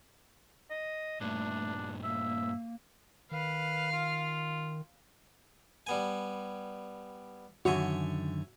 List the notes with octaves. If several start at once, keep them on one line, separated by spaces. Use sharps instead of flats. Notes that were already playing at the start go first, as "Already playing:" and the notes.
D#5
G2 A#2 A3 D4
A#3 E5
D#3 B4 F5
F4
G3 B3 G#5
F#2 D3 D#3 F#4 C#5 E5 G#5